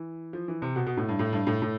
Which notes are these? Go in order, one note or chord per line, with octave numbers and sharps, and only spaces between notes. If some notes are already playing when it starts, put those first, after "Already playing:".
Already playing: E3
F3
E3
C3
B2
B2
A2
G2
A2
G2
A2
A2